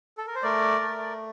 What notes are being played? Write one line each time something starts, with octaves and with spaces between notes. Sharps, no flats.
A4
A#4
C5
A3 A#4 D5
A3